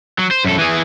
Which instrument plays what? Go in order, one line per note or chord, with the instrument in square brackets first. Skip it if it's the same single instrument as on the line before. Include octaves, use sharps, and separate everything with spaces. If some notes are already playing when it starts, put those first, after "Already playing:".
[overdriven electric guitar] F#3
C5
F#2 A4
E3 G#4